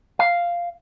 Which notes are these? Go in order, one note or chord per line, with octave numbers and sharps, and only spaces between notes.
F5